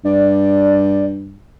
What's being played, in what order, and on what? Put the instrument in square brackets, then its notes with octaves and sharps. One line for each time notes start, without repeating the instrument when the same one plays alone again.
[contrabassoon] G2 [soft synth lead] D5